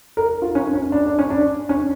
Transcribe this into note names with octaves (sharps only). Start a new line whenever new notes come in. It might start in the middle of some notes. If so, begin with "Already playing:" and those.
A#4
F4
C#4
C#4
D4
D4
C#4
D4
C#4